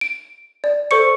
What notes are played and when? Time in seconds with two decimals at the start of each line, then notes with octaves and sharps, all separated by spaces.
0.01 D7
0.64 D5
0.91 A4 C5 C#6 C#7